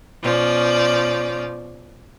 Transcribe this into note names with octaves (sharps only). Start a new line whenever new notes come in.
B2 F3 C#4 D5